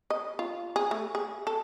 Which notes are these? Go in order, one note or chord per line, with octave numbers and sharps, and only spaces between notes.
D#5
F4
G#4
A3
G#4
A4